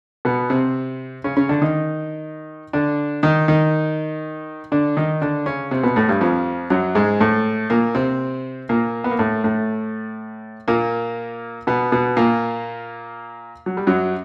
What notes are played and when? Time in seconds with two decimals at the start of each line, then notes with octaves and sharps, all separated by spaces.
0.25 B2 B3
0.50 C3 C4
1.24 C#3 C#4
1.37 C#3 C#4
1.49 D3 D4
1.61 D#3 D#4
2.73 D3 D4
3.23 D#3 D#4
3.48 D#3 D#4
4.72 D3 D4
4.97 D#3 D#4
5.21 D3 D4
5.46 C#3 C#4
5.71 C3 C4
5.83 B2 B3
5.96 A2 A3
6.09 G2 G3
6.21 F2 F3
6.70 F#2 F#3
6.95 G#2 G#3
7.20 A2 A3
7.70 A#2 A#3
7.95 C3 C4
8.69 A#2 A#3
9.04 B3
9.11 A#3
9.19 A2 A3
9.44 A2 A3
10.68 A#2 A#3
11.67 B2 B3
11.92 B2 B3
12.17 A#2 A#3
13.66 F#3
13.77 G3
13.87 F#2 F#3